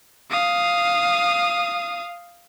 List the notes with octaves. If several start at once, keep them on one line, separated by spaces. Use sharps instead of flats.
F5 D#6